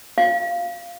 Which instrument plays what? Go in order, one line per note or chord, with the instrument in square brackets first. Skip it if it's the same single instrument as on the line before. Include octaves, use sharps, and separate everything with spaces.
[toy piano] F5